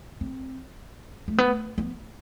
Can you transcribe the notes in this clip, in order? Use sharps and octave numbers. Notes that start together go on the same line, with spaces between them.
C4
A3
B3
B3